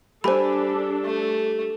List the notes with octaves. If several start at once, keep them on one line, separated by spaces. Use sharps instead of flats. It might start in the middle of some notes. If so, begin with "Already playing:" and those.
G3 D4 G4 A4 C5 G#5 B5
A3